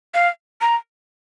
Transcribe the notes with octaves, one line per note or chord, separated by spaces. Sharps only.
F5
A#5